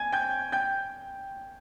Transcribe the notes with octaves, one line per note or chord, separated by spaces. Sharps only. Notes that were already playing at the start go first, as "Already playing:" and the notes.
Already playing: G#5 G#6
G5 G6
G5 G6